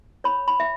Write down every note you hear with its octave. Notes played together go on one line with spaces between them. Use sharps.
C#5 B5
B5
E5